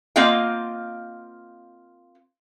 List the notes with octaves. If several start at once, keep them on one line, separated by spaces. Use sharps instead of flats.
A#3 C4 F4 D#5 F5 G5